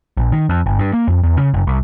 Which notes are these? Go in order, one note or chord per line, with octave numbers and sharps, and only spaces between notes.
A#1
D#3
F2
G1
G2
A#3
F2
E2
C#3
F#1
C2